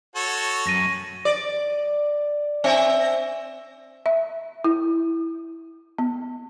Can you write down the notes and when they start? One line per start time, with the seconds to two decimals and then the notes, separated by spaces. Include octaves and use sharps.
0.16 F#4 A4 C#5
0.67 F#2 A#6 D#7
1.25 D5
2.64 C4 E5
4.06 E5
4.64 E4
5.98 B3